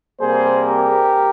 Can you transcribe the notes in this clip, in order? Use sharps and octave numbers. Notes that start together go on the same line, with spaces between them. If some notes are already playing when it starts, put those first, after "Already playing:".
C3 G3 A#3 G#4 C5
G4 A#4